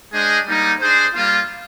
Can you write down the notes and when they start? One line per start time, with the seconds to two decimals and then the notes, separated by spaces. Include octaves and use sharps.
0.13 G#3 D4 G#4 C5 D#5
0.47 G3 A#3 D#4
0.81 G#3 D4 G#4 C5
1.14 G3 A#3 F4